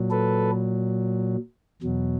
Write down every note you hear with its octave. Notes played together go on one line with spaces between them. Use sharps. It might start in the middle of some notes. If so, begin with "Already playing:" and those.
Already playing: A#2 F#3
A4 B4
E2 B2 F#3